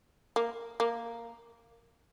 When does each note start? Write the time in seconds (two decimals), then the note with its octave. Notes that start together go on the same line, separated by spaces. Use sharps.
0.36 A#3
0.80 A#3